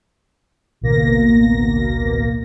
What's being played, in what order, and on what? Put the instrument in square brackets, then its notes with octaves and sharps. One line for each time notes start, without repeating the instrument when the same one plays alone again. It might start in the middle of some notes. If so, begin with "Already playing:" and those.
[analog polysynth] A1 D2 B2 A#3 A#6